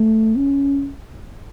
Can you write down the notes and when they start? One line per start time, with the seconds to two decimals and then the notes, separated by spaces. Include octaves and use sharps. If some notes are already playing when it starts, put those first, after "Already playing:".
Already playing: A3
0.37 C#4